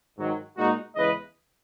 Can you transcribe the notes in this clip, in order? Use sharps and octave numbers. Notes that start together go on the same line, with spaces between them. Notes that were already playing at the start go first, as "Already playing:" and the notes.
G#2 D#3 F#3
A#2 G#3 D#4 F#4
E2 C#3 E3 G#3 B4 D#5